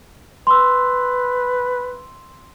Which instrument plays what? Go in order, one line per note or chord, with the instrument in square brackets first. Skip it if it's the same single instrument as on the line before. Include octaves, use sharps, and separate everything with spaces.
[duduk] B4 [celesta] C6 E6